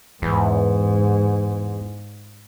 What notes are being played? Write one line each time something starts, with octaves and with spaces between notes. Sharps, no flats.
E2 G#2